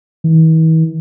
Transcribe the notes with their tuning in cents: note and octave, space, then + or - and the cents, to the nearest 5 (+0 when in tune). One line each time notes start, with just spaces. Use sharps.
E3 -45